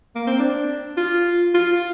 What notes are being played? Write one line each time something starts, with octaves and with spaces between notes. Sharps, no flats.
A#3
C4
D4
F4
F4